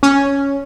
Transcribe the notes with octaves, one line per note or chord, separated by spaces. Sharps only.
C#4